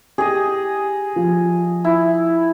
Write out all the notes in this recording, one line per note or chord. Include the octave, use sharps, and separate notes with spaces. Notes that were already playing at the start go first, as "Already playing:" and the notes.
G4 G#4 D#5
F3
E4